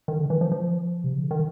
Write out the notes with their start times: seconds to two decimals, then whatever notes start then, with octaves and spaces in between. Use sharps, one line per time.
0.08 D#3
0.18 D3
0.30 E3
0.41 F3
0.52 F3
1.04 C3
1.13 C#3
1.22 D3
1.31 D#3